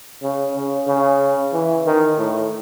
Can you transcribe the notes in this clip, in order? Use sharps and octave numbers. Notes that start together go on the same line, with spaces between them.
C#3
C#3
C#3
E3
D#3
A2